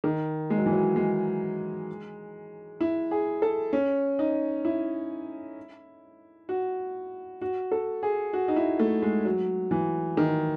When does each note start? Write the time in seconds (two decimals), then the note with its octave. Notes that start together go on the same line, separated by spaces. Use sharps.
0.04 D#3
0.50 G#3
0.58 F#3
0.66 E3
0.73 F#3
0.96 G#3
2.80 E4
3.11 G#4
3.42 A4
3.73 C#4
4.19 D#4
4.65 E4
6.49 F#4
7.41 F#4
7.72 A4
8.03 G#4
8.33 F#4
8.48 D#4
8.56 E4
8.80 A3
9.02 G#3
9.25 F#3
9.71 E3
10.17 D#3